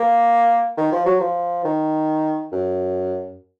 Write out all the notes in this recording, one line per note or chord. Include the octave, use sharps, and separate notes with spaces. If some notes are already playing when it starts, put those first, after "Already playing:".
Already playing: A#3
D#3
F3
F#3
F3
D#3
F#2